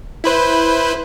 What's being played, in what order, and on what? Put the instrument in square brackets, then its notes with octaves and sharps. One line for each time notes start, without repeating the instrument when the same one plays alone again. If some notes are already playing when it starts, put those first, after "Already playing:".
[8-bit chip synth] E4 B4 C5